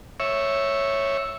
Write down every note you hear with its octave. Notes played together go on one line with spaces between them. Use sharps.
C#5 E5